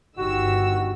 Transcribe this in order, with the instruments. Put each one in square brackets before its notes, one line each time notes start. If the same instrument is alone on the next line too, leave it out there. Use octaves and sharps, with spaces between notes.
[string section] G1 D#3 E6 [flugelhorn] F#4 [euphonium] G4